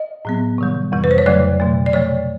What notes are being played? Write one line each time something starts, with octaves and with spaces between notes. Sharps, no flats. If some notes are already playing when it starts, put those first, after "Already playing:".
Already playing: D#5
A2 F#3 B3
C3 D#3 G3
F2 C3 E3 G3
B4
C5
C#5
F2 C#3 F#3 A3 D5
B2 F#3 A3
D5
C3 F3 A3 C#5